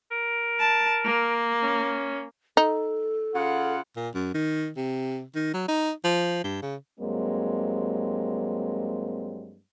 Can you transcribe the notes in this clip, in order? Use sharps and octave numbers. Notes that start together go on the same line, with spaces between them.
A#4
A5
A#3
C#4
D#4 A4
C#3 F4 F#5
A#2
F#2
D#3
C3
D#3
F#3
D#4
F3
G2
C#3
G2 F#3 G#3 A#3 C4